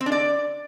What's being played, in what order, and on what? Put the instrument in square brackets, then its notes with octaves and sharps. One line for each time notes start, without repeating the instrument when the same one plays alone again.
[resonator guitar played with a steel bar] C4
D4
D5